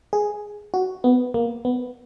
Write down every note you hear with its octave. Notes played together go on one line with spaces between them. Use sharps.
G#4
F#4
B3
A#3
B3